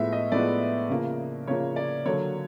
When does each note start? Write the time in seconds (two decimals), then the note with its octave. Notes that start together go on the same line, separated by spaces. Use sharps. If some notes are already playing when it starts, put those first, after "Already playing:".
Already playing: A2 F3 G#3 B3 E5
0.13 D#5
0.32 A2 F3 G#3 B3 D5
0.90 C#3 F3 A#3
1.48 C#3 F3 A#3 C#5
1.76 D5
2.06 D3 F#3 A#3 C#5